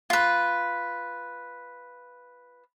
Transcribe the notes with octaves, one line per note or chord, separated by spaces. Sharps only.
F4 B4